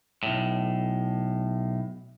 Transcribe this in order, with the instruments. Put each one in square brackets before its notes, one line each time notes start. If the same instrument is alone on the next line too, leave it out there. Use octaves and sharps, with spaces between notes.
[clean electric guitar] B1 A2